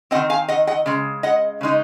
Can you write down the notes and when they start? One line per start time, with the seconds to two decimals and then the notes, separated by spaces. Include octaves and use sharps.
0.11 D#3 G#3 C4 D#5 F#5
0.30 F5 G#5
0.48 D#5 F#5
0.67 D#5 F#5
0.86 C#3 G#3
1.23 D#5 F#5
1.61 C#3 G#3 D#4